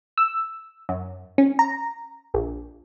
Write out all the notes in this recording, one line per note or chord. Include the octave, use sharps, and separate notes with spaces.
E6
F#2
C#4
A#5
A#1